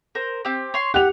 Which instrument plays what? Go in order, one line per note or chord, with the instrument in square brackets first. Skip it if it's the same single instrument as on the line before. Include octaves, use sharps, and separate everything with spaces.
[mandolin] A#4 C5
C4 G4
C#5 C6
[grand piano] G4 F7 [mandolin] F#5